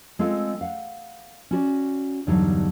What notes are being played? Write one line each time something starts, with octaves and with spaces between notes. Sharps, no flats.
G#3 C4 F4 A4 F5 G#5
F5 F#5
C#4 F#4 D5
E2 G2 D3 F#3 G3 D#4